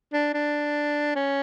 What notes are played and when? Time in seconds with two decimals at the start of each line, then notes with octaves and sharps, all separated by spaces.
0.13 D4
0.34 D4
1.16 C#4